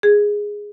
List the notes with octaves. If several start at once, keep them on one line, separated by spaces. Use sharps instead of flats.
G#4